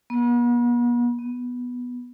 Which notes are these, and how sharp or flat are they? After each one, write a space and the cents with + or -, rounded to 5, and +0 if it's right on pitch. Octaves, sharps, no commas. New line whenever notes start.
B3 -45
B3 -5